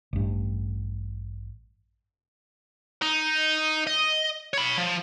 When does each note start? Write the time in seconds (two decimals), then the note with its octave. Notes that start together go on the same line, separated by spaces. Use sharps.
0.13 A1 G2
3.02 D#4
3.87 D#5
4.54 C#5 B5
4.78 F3